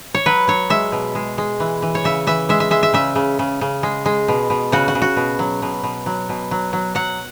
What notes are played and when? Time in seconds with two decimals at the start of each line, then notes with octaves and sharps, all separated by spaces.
0.14 C#5
0.26 F#3 B4
0.48 F#3 C#5
0.70 G#3 E5
0.92 B2
1.15 G#3
1.38 G#3
1.60 E3
1.82 E3
1.95 C#5
2.04 C#3 E5
2.27 E3 E5
2.49 G#3 E5
2.60 E5
2.71 G#3 E5
2.83 E5
2.93 C#3 E5
3.16 C#3
3.39 C#3
3.61 C#3
3.83 G#3
4.06 G#3
4.28 B2
4.50 B2
4.72 C#3 F#4
4.88 F#4
4.95 C#3
5.02 F#4
5.16 B2
5.39 F#3
5.62 B2
5.83 B2
6.06 F#3
6.29 B2
6.51 F#3
6.73 F#3
6.95 F#3 F#5